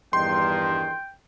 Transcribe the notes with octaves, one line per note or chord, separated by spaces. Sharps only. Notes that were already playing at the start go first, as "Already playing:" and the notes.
E2 G2 D#3 G5 C6